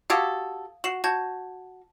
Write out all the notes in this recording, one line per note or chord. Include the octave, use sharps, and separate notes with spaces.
F#4 G4 A4 F5 D#6 G#6
F#4 C7 E7 F#7
F#4 A5 G6 G#6